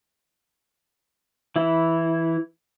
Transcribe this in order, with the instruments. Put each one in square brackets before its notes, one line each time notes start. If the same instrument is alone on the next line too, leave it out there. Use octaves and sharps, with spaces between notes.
[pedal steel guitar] E3 E4